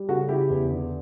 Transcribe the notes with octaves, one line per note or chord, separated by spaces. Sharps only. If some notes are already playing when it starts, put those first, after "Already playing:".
Already playing: G3
C#3 F#4 A4
C#3 E4 G4
E2
D3